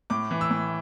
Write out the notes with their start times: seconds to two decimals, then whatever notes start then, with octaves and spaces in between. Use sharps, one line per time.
0.10 A2 D6
0.31 E3
0.41 E6
0.51 A2